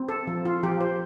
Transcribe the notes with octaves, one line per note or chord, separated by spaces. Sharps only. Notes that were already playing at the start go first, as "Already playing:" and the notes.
Already playing: C4
A4
F3
F4
F3 G4
C5